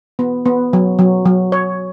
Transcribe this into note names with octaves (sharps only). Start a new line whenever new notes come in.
B3
B3
F#3
F#3
F#3
C#5